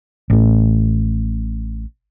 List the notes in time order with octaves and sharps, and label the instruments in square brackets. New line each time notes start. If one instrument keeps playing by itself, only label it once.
[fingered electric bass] A1 A2